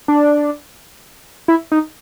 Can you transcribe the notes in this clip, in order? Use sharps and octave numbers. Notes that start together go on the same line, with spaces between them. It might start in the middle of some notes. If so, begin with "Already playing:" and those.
D4
E4
D#4